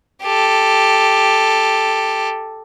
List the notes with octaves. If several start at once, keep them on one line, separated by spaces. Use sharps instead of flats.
G4 A4